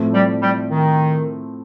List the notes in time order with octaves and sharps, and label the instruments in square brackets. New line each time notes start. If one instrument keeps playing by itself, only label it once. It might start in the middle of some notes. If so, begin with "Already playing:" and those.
Already playing: [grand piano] A2 F3 A3 C4
[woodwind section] G3
G3
D#3